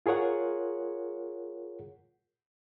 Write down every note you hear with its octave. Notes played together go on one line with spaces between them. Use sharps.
F4 G#4 A#4 C#5 F#5